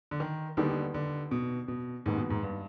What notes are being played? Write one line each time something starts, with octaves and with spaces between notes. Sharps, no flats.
D3
D#3
D#2 D3 D#3 G3 B3
D3
B2
B2
D#2 G#2 D#3 B3
B2
G#2
G2